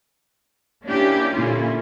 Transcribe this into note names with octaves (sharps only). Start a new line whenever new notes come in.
A#3 C#4 D4 E4 G4
A#2 D3 A#3 C#4 E4 F4